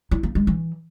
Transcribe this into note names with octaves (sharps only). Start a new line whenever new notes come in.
E4
A#3
G#3
E3